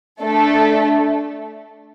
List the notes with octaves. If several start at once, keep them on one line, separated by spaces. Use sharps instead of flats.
A3 D4 A4